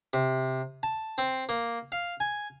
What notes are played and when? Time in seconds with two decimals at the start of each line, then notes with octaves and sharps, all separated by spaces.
0.13 C3
0.83 A5
1.18 C4
1.49 A#3
1.92 F5
2.20 G#5